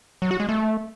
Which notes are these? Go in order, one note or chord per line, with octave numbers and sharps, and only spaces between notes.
F#3
F#4
G#3
A3